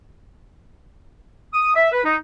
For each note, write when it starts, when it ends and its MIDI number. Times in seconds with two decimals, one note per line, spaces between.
1.53 1.73 87
1.76 1.89 76
1.92 2.03 71
2.05 2.15 63